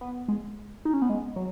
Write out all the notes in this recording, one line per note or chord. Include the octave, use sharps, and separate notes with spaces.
B3
G#3
D#4
C#4
B3
G#3
F#3